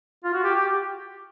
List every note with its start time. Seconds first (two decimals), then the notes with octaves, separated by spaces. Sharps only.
0.24 F4
0.34 F#4
0.44 G4
0.55 G4